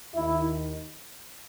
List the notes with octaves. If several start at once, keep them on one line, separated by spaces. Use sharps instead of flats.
D#2 D#3 E4